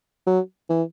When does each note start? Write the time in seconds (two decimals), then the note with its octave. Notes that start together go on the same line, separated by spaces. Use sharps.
0.27 F#3
0.70 E3